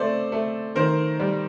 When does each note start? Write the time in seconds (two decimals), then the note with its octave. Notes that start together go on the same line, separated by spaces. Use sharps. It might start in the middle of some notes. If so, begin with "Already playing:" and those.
Already playing: A3 C4 C5 D5
0.32 A3
0.75 D#3 A#4 C5
1.20 G3